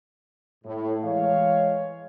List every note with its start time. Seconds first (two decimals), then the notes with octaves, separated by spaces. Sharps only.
0.65 A2
1.03 E3 G#3 C#5 F5